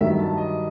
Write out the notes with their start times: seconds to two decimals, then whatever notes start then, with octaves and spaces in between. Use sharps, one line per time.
0.01 G2 D#3 F#3 E5
0.19 A5
0.37 D#5